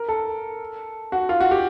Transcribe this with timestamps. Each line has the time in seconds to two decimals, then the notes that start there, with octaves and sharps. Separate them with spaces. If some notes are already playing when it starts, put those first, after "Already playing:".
Already playing: A#4
0.09 A4
1.12 F#4
1.29 F4
1.40 F#4
1.51 G4